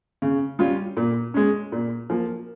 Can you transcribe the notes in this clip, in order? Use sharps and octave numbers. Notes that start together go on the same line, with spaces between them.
C#3
G3 C#4 F4
A#2
G#3 C#4
A#2
F3 A#3